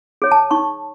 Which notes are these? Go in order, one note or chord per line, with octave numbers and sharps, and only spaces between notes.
G#4 C#5
A5
D#4 C#6